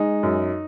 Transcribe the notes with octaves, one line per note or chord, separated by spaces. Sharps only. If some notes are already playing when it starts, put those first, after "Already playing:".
Already playing: G#3 D#4
F#2